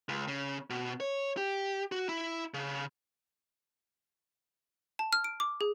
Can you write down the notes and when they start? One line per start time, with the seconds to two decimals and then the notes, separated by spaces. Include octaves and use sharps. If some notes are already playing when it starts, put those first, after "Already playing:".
0.09 C#2
0.28 C#3
0.70 B2
1.00 C#5
1.37 G4
1.92 F#4
2.09 E4
2.54 C#3
4.99 A5
5.13 F6
5.24 D7
5.40 D6
5.61 G#4